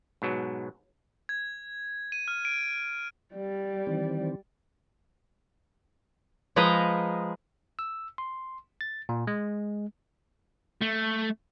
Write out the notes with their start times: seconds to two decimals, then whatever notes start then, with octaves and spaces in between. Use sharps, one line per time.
0.22 G#2 B2 F#3
1.29 G#6
2.12 D#7
2.28 F6
2.45 D7
3.35 G3 D5
3.87 D#3 E3 C4
6.56 F3 G#3 G#4 B4 D#5 A#5
7.79 E6
8.18 C6
8.81 A6
9.09 A#2
9.27 G#3
10.81 A3